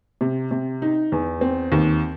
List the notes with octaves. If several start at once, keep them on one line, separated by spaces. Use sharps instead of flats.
C3
C3
D#4
E2
C4
D#2